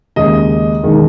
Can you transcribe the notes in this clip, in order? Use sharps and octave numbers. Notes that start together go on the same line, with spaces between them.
D#2 C#3 G#3 D#5
E1 D#3 G#3